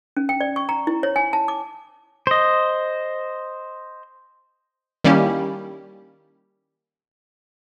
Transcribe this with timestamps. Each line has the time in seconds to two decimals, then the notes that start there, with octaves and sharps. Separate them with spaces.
0.17 C#4
0.29 G5
0.40 D5
0.56 C#6
0.69 A#5
0.87 E4
1.03 C#5
1.16 G#5
1.33 A5
1.48 D6
2.27 C5 D#5
5.04 D#3 G3 A#3 C#4 E4 G4